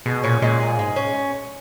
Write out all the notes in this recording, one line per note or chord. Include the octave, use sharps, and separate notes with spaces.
B2 G#3
A#2 C#4
A#2 G#3
G#4
G#2 G#3
C#4